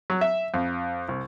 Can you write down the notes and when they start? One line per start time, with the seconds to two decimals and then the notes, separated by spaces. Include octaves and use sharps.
0.10 F#3
0.21 E5
0.54 F2
1.08 C2